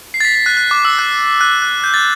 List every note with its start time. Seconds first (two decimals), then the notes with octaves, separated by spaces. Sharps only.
0.14 C7
0.20 A6
0.25 B6
0.35 A6
0.46 F#6
0.57 F#6
0.71 D6
0.85 E6
0.99 F#6
1.41 F#6
1.62 F#6
1.84 G6
1.94 A6